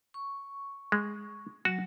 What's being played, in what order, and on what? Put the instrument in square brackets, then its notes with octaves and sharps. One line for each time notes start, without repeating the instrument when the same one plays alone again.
[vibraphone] C#6
[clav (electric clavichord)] G#3
[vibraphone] F#3 [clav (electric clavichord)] F#4